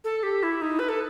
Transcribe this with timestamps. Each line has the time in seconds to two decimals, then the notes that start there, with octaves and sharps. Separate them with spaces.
0.04 A4
0.23 G4
0.43 E4
0.61 D#4
0.79 B4
0.88 A4